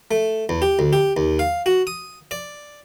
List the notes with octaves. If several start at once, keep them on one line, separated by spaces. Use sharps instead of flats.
A3
E2
G4
D2
G4
D#2
F5
F#4
D#6
D5